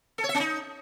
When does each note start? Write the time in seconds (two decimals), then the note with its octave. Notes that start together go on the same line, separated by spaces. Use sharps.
0.18 A4
0.24 C#5
0.29 E5
0.34 C#4
0.40 D#4